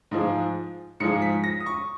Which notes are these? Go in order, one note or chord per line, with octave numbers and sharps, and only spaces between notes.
G#2 F3 G#3
G#2 F3 G#3 C#7
B6
A#6
D#6
C#6